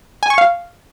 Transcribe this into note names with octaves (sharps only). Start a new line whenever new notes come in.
G#5
C#6
F5